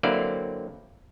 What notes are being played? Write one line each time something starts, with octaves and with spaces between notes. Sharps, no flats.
D3 F#3 A#3 C4 E4 D5